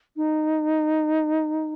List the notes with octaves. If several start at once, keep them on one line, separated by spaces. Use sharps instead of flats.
D#4